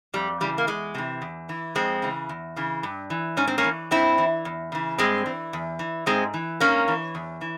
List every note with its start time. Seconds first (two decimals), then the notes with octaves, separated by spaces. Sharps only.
0.14 F2 G3
0.41 C#3 E3 G3
0.58 A#3
0.67 E2 G#3
0.95 C3 E3
1.22 E2
1.49 E3
1.75 F2 G#3 C4
2.02 C#3 E3
2.29 E2
2.56 C#3 E3
2.83 G2
3.10 E3
3.37 G#2 C#4
3.47 C4
3.58 A#3 C#4
3.64 E3
3.91 G2 C4 E4
4.18 E3
4.45 E2
4.72 C#3 E3
4.98 G2 G#3 C4
5.26 E3
5.53 E2
5.79 E3
6.06 G#2 G#3 C4
6.34 E3
6.60 G#2 A#3 C#4
6.88 E3
7.15 E2
7.41 E3